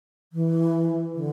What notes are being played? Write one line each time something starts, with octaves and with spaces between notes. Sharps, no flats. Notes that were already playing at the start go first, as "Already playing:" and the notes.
E3
D3